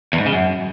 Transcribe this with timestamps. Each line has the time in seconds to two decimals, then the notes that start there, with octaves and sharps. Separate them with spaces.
0.13 E2
0.19 G#2
0.26 C#3
0.32 F#2